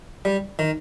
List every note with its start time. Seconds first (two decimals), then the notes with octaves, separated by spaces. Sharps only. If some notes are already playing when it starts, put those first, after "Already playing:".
0.25 G3
0.59 D#3